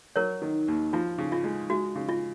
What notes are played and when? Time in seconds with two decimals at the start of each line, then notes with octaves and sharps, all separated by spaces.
0.16 F#3 A#4 C#5
0.42 D#3
0.68 D#2
0.93 F3 F4
1.18 C#3
1.32 F4
1.44 G#3
1.70 G#3 F#4
1.95 C#3
2.09 F4